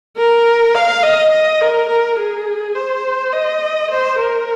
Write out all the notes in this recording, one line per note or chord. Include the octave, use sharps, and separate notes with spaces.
A#4
F5
D#5
D#5
A#4
A#4
G#4
C5
D#5
C5
A#4